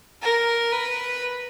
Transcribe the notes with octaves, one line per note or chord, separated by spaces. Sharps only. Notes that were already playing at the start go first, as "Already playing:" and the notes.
A#4
B4